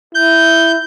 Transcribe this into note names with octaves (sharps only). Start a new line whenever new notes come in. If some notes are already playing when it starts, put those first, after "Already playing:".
E4 G6